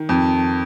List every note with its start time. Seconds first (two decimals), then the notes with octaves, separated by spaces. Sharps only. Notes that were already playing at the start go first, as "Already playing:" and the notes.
Already playing: D#3
0.09 F2